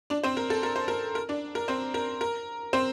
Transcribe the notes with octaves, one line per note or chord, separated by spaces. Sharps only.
D4 D5
C4 C5
A#4
A4
A#4
C5
A#4
A#4
D4 D5
A#4
C4 C5
A#4
A#4
C4 C5